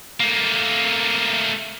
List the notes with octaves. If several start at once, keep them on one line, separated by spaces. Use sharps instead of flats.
A3 A#3